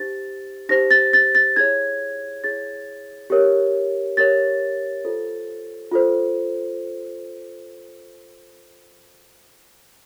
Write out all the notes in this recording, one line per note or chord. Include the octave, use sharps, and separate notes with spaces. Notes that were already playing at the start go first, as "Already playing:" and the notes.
Already playing: D#4 G4 C5 A6
D#4 G4 C5 A#6
A6
A6
A6
E4 G#4 C#5 G#6
E4 G#4 C#5 A6
G4 A#4 C#5
G4 A#4 C#5 A6
F4 A4 C5
F4 A4 C5